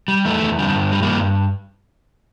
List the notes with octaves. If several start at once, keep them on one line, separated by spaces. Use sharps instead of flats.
G3
E2 A3
E2
D3 G3
G2
G3
G3 A#3
G2